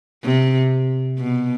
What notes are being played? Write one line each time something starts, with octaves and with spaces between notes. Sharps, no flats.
C3
B2